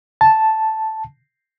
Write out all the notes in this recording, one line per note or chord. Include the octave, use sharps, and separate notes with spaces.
A5